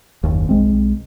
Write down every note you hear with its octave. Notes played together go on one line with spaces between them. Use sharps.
F#1 D#2
B1 G#3 C4